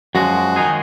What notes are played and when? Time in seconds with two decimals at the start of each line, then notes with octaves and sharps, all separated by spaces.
0.15 F#2 F3 G#3 F#4
0.56 D#3 G#3 D#4 G#4